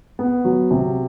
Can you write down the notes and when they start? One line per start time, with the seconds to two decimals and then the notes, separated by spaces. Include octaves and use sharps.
0.19 B3
0.44 F#3
0.71 C3